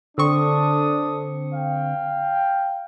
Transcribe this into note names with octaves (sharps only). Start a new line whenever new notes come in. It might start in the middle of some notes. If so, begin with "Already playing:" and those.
D3 C4 D4 A4 C#6 D#6
F5 G5